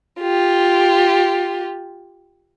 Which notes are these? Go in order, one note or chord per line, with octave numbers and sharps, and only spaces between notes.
F4 G4